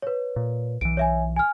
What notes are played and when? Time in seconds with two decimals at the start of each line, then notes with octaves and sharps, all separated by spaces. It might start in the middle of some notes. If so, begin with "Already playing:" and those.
0.02 B4 C#5
0.36 A#2
0.81 B1 E3 D7
0.97 C#5 E5 G#5
1.36 G#5 F6